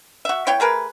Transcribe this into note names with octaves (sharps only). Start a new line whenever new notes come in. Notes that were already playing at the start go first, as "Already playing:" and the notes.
F#4 E5
B3 E4 C#5 G5
A3 G#4 A#4 B4